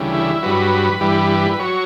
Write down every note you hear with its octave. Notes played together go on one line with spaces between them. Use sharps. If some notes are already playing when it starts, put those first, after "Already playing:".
Already playing: D2 C#3 E3 G3
E4
G2 F#3 B4
G2 E3 G3
B4
F#3 C#5